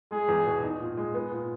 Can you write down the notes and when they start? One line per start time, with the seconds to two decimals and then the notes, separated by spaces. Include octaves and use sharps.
0.11 G#3 G#4
0.28 E2
0.46 B2
0.63 D#4
0.80 A#2
0.97 G#3
1.14 B3
1.32 A#2